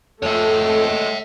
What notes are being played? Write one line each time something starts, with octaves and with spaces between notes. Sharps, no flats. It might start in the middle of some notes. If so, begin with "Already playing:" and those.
F2 G#3 A3 A4 C#5 E5